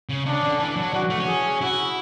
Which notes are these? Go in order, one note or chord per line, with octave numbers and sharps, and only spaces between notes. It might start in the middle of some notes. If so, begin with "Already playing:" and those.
C#3
C#3 D4
D3
E3 D4
F#3
E3 F#4
A3
C#4
G#4
E4 F#4